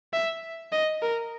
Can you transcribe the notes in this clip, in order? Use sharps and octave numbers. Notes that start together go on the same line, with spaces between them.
E5
D#5
A#4